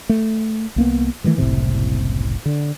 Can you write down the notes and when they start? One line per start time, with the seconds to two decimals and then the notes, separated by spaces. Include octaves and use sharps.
0.09 A3
0.76 C2 A#3 B3
1.24 D#3 E3 F#3 A3
1.38 F#1 C2 A2 C3
2.46 D3